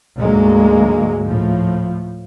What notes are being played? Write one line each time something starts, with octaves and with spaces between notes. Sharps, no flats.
D2 G#2 F#3 G#3 A#3
A2 F3